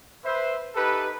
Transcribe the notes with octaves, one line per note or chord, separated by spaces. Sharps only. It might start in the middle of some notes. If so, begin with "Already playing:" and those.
B4 C5 E5
D#4 G4 A4 B4